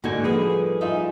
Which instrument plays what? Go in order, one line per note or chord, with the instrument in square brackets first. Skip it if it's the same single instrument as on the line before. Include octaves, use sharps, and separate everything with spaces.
[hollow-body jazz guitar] G#2 A#3 G#5 [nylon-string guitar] D3 D#4 F#4
[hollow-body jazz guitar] F3 G3 [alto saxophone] G#4 [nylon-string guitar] A4 B4
[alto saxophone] D#4 [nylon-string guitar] F4 G#4 E5